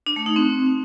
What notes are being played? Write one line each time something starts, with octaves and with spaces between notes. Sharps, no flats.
D4
A3
D#4
C4